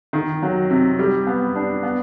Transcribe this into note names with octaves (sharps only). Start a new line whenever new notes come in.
D#3
F#3
C3
G3
B3
D4
B3